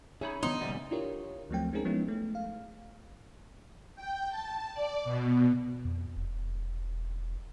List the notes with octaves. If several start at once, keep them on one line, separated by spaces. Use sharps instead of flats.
C#4 D#4 G#4 C#5 E5 B5
F2 D3 B3 D4 D#4 C5 C6
F1 F#2 A#2 C#3 G3 F#4 D5 E5
D4 E4 F4 G4 A#4 C#5
D2 F3 F#3 A3 C4 G5
G#3 C4 C#4 D#4 G#4 A#4
F3 G#3 B3 C#4 D#4 E4
A3
F5
G5
A5
D5
B2
F2
E1